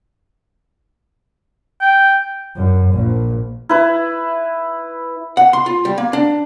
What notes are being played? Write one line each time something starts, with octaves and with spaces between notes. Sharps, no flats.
G5
F#2
A#1
E4 B4
F#5
C6
F4
G3
A#3
D4